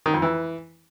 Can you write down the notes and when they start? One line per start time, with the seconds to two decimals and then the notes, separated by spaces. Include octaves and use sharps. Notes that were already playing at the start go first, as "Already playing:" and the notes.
0.06 D#3
0.14 F2
0.22 E3